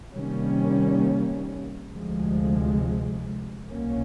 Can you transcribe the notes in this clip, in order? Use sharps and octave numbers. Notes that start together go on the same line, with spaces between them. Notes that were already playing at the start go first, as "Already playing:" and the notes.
C3 D#3 G3 A#3 C#4
D2 C3 F3 G#3
C2 B2 F#3 A#3 C#4